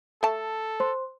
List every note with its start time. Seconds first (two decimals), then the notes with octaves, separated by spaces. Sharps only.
0.23 A3 A4 A5
0.80 C5 C6